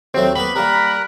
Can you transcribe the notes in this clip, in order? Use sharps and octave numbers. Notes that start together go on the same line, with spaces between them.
D#2 F#3 A3 C4
A#3 B3 B4 B5
G3 A#3 A#4 A#5 F#6